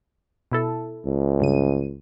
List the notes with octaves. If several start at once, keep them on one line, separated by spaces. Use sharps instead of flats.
B2 E4 A4
C#2
G2 C#3 D#7